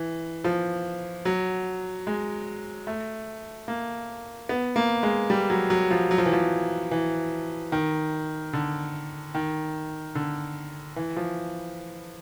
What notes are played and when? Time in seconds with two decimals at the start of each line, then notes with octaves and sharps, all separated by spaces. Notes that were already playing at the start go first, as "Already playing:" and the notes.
Already playing: E3
0.44 F3
1.25 F#3
2.07 G#3
2.87 A3
3.68 A#3
4.49 B3
4.76 A#3
5.03 G#3
5.30 G3
5.50 F#3
5.70 F#3
5.91 F3
6.11 F#3
6.18 F3
6.26 E3
6.33 F3
6.91 E3
7.72 D#3
8.53 D3
9.35 D#3
10.15 D3
10.96 E3
11.16 F3